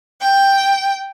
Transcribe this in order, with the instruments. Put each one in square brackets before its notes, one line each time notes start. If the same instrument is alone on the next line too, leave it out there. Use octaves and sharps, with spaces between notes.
[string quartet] G5